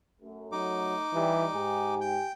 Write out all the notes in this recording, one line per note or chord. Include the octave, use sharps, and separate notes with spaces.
F#2 A3
F#3 D#4 D6
E3 G3
G#2 G4 G#5
G5